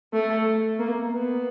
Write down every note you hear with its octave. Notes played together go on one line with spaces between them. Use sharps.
A3
A#3
B3